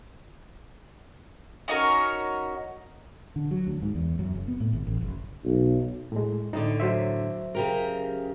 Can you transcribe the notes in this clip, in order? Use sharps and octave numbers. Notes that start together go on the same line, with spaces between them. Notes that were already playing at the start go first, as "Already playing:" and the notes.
C#4 D#4 F#4 A#4
D3
F#3
D2
G#2
E2
F#2
F#1
B3
A2
G#1
A1
F#1
B1
A2 G#3
A2 D3 D#4 D#5
F#3 C5 E5
C#3 G4 A#4